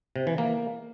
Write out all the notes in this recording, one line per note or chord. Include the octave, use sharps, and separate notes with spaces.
C3
E3
A#3